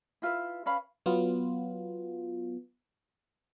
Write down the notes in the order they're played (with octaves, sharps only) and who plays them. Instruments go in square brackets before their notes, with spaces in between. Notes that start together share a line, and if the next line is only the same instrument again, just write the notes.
[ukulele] E4 F4 B4 E5
C#4 B4 F5 B5
[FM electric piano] F#3 B3 F4